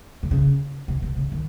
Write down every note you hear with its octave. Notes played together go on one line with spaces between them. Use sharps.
D3
C#3
C3
C3
C#3
D#3